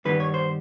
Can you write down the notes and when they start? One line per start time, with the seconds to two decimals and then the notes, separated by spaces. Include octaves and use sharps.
0.05 G2 D#3 G3 B3 B4
0.20 C#5
0.34 C5